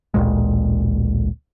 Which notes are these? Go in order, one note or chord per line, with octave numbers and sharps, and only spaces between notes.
A1 D2 A#2 G#3